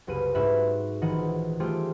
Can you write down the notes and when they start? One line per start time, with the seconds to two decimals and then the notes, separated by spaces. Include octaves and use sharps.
0.07 F#1 C2 B4 D#7
0.35 G#2 F#4 B4 E5
1.01 A#1 D#3 E3 D#5 F#5
1.60 G3 A3 F4 G4 G#4 C5